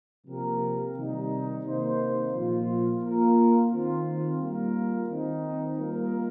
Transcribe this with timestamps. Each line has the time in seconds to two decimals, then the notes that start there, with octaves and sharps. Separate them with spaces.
0.26 C3 F3 A#3 G4 A#4
0.95 C3 D#3 G3 D#4
1.64 C3 D#3 A#3 D#4 C5
2.33 A#2 F3 A#3 F4
3.02 A#3 F4 A#4
3.71 D#3 C4 F4
4.39 G3 A#3 F4 A#4
5.08 D#3 C4 D#4
5.77 G3 A#3 F4 A#4